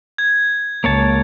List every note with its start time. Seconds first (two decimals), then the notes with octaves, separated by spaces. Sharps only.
0.18 G#6
0.84 C#2 A#3 C#5 A5